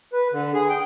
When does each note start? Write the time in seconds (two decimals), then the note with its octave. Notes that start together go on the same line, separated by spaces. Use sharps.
0.13 B4
0.33 D3
0.54 G#4
0.69 G5